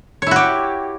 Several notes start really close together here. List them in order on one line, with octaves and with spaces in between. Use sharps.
C#5 E4 F#4 G4